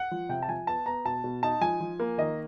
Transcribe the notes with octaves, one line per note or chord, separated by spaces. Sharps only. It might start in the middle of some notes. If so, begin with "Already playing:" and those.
Already playing: F#5
F3
C3 G5
A5
F3 G#5
B3 A5
B3 A#5
B2 A5
B2
D#4 A5
F3 G#5
F3
A#3
D#3 D#5